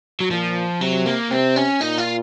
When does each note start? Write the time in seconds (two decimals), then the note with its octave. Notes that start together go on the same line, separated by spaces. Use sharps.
0.20 F#3
0.30 A#2 F3
0.81 C3 F#3
1.06 A#3
1.31 C3 C4
1.56 C#4
1.81 A#2 D#4
1.98 F4